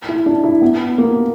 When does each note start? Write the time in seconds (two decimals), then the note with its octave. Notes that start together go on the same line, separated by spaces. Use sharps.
0.09 E4
0.26 D4
0.44 E4
0.62 B3
0.98 A#3